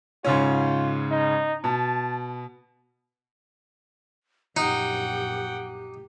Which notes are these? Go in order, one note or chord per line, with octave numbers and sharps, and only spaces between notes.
G#2 C#3 C#4 F4
D#4
B2 A5
A#1 F#2 D#4 G4 F#5 G5